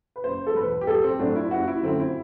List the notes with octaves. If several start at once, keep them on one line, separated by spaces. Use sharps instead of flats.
B4
F#1 C5
A4
E2 B2 B4
G4
B1 A4
C4
A2 F#3 A3 D4
E4
F#1 F#4
E4
F#2 D3 A3 C4
E4